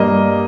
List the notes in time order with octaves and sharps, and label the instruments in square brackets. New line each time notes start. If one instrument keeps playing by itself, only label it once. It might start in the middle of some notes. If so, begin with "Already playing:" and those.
Already playing: [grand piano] G2 G3 A#3 D#5